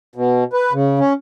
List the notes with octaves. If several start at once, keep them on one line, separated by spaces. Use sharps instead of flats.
B2
B4
C#3
C#4